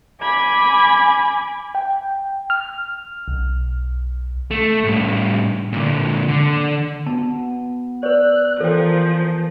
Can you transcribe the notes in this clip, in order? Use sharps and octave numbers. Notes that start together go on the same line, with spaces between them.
G#5 B5 D6 G#6
G5
F6
B1
A3
A2 G3
A#2 D3
D3
B3 A5
B4 D5 E6 F#6
E3 F3 A4 A#4 C5 G5